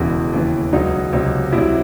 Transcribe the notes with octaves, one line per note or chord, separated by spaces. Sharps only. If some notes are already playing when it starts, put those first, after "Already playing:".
Already playing: E1 E2 C#3 E4
D#2 C#3 E3
C#2 C#3 F#3 D#4
C#2 C3 F#3
C2 C3 F#3 E4